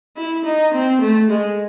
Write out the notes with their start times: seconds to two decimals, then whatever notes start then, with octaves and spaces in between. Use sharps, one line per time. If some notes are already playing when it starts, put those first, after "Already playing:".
0.17 E4
0.45 D#4
0.74 C4
1.01 A3
1.30 G#3